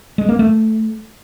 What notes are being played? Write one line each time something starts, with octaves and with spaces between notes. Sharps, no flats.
G#3
A#3
A3